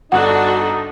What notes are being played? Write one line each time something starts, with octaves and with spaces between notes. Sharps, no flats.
G1 G2 D4 D#4 F#4 A4 F#5 F#6